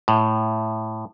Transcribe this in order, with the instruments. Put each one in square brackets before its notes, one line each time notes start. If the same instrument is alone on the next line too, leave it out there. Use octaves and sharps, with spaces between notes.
[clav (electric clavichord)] A2